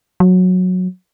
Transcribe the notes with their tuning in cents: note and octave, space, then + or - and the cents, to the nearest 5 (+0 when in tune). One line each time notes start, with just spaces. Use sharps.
F#3 -15